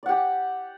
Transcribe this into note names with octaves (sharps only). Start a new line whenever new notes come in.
G4 D5 F#5